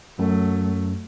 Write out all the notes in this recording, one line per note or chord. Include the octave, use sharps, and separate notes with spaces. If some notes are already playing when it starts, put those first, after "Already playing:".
F#2 F#3 A3